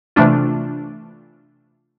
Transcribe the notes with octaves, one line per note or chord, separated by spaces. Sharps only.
C3 E3 A3 D4 F4